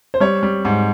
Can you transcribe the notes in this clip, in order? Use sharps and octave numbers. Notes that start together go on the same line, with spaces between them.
C5
G3 C#5
G3
G#2